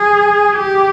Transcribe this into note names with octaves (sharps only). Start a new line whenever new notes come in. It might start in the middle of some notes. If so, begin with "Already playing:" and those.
Already playing: G#4
G4